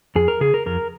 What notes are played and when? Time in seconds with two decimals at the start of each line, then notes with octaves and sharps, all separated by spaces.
0.15 F2 G#4
0.28 A#4
0.41 C#3 G#4
0.54 A#4
0.66 F2 A#4